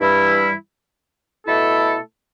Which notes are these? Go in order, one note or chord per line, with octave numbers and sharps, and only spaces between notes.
G2 E3 G3 E4
B2 A3 E4 A4